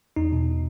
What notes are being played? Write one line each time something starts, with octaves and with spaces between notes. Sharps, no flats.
E2 D#4
B2